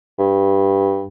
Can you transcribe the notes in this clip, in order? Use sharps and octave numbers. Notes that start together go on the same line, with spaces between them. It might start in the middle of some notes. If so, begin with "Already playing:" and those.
G2